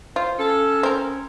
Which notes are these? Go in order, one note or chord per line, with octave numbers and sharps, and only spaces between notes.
F4 C5
C#4 A4
C4 A#4